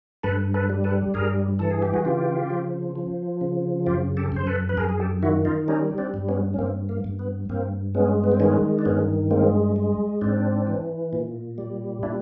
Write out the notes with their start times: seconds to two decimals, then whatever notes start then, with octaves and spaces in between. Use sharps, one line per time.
0.23 G2 A4 B4
0.54 A4 B4
0.69 G3
0.84 A4 B4
1.14 G2 G#4 A#4
1.59 E3 A4
1.71 G#4
1.82 G4
1.94 F#4 G#4
2.05 C#3 F4 G4
2.50 F3
2.96 F3
3.41 C#3
3.86 F#2 F4 G4
4.17 G4 A4
4.32 F#2 C5
4.47 A4 B4
4.69 B4
4.77 F#2 G#4 A#4
4.89 G#4
5.00 G4 A4
5.22 D#3 E4 F#4
5.45 D#4 F4
5.68 G3 C#4 D#4
5.98 C4 D4
6.14 G2
6.29 B3 C#4
6.54 C#4
6.58 G2 A#3 C4
6.89 A#3
7.04 G2
7.19 B3
7.49 G2 A#3 C4
7.94 G#3 B3 C#4
8.24 B3
8.32 C4
8.40 D#3 B3 C#4
8.79 D4
8.85 G2 B3 C#4
9.31 G#3 A#3 C4
9.76 G#3
10.21 G#2 C4 D4
10.67 E3
11.13 A#2
11.58 G3
12.03 A#2 D4 E4